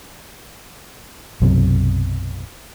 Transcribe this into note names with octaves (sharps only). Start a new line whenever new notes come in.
B1 F#2 C3